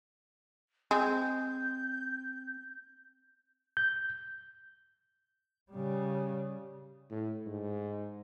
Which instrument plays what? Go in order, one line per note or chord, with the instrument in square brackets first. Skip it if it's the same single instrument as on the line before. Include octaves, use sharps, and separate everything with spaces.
[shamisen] G#3 [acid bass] C4 [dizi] G6
[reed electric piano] G6
[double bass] C#3 G3
[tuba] A2
G#2